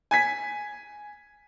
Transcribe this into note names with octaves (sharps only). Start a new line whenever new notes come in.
G#5 G#6 B6